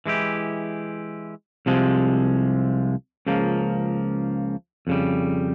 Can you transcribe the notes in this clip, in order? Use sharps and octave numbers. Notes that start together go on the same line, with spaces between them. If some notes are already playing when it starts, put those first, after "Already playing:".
E3 G#3 E4 G4
C2 C3 F3 G#3
C#2 C#3 F3 A#3
F2 C#3 G3